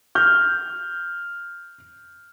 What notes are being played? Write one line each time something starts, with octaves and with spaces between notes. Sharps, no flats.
F6 G6